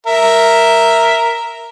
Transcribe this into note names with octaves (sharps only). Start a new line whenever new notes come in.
A#4 E5